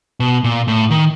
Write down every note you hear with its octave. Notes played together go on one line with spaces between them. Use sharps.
B2
A#2
A2
D#3